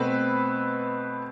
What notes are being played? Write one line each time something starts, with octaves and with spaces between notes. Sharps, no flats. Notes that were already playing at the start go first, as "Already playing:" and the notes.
Already playing: B2 A3 C4 B4